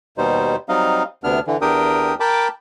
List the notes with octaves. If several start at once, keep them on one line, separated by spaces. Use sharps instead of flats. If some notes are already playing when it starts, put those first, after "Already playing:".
D#2 B2 G3 D#4 C5
F#3 G3 C4 D#4 D#5 F5
D2 C3 B3 D4 F6
D3 E3
E2 D4 G4 A#4 G5 D#6
A#4 G5 A5 B5 D6